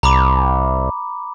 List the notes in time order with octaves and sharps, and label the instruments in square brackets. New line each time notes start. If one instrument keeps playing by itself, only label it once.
[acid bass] C2 [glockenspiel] A#5 B5 D6